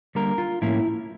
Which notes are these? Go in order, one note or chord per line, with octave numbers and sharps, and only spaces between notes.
D3 G3 A#3 A#4
F4
A2 F3 A#3 C#4 E4